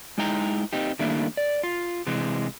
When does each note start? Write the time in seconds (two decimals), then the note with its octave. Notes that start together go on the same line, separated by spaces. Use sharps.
0.18 G#3 D#4 E4 G5 A#5
0.73 C4 D#4 G4
0.99 D#3 G3 A3 A#3 D4 E4
1.37 D5
1.63 F4
2.07 C3 E3 G#3